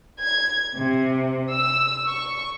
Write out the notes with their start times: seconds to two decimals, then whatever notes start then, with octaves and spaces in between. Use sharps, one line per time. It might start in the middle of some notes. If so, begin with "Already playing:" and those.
0.22 G#6
0.75 C3
1.52 E6
2.09 C#6